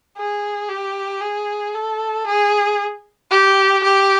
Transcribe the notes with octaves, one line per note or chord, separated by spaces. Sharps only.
G#4
G4
G#4
A4
G#4
G4
G4